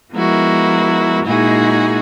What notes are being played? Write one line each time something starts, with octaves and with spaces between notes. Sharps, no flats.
F3 G#3 B3 E4 F#4 A#4
A#2 G#3 D#4 E4 F#4 G#4